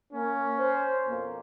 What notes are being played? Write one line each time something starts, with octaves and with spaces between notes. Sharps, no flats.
A#3 C#4
C5
F2 B2 A#3